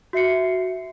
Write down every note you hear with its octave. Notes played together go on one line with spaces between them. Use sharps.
F#4 E5 C7 C#7